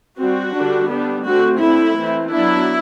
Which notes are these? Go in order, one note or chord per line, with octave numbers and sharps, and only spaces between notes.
G3 C4 F#4
D3 G3 D4
G3 B3 D4
D3 A3 C4 F#4
D3 A3 C4 E4
E3 A3 C4
F#3 B3 D4 E4